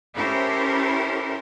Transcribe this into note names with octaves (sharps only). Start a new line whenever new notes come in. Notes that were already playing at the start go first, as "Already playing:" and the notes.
C#4 E4 G4 A4 A#4 C5